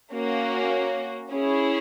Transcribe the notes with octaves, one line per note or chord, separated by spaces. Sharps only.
A#3 C#4 F#4
C#4 E4 G#4